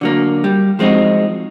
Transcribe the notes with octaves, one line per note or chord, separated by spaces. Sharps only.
D3 F#3 A#3
G3
F3 G#3 C4 D#4 F#4